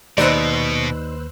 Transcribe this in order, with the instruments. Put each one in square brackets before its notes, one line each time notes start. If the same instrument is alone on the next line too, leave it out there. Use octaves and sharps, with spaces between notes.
[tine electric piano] D#2 B4 [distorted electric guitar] B2 [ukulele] D#4 D5 [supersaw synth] C5 E6 F#6